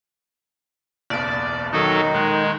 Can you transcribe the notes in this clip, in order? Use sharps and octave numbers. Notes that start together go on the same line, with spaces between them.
F#1 B1 E2 D5
D#3 F#3 D#4 F#4 A4
D#1 G#3 F#6